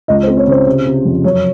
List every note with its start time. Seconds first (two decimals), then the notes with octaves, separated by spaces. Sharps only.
0.08 C#2 D#5
0.23 C5
0.27 C4
0.37 C#5
0.47 C#3 C5
0.66 C3
0.86 C3
1.05 F2
1.24 F#2 C#5